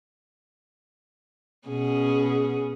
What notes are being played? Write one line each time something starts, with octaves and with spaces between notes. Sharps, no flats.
B2 C#4 G#4